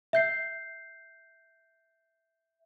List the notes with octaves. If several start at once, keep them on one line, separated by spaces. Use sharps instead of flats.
E5 G6 C7